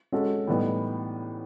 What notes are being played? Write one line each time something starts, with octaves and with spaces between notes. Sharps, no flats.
G#3 C#4 F#4 A4
A2 E3 G3 B3 D#4